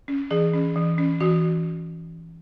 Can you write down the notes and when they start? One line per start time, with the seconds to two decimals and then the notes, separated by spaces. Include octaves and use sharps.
0.08 C#4
0.31 E3 G#4
0.53 C#4
0.76 E3
0.98 C#4
1.20 E3 F#4